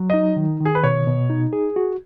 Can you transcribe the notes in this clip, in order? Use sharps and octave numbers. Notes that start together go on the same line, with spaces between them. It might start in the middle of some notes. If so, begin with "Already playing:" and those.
Already playing: F#3
D#4 D#5
D#3
D#3
G#4
B4
B2 C#5
B2
D#4
G#4
F#4